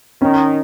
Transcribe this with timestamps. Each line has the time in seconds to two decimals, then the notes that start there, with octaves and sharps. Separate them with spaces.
0.22 D#3 C#4